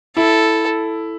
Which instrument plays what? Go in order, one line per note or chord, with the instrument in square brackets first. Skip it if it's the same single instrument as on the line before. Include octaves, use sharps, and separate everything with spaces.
[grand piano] E4 [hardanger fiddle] A4